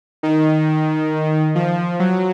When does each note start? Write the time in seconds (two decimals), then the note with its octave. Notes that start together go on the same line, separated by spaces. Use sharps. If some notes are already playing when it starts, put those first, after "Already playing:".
0.23 D#3
1.55 F3
2.00 F#3